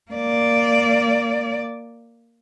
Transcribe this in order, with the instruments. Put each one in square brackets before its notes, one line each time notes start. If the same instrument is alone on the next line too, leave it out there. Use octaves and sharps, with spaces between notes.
[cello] A#3 D5